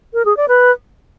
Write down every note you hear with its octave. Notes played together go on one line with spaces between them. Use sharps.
A#4
G#4
D5
B4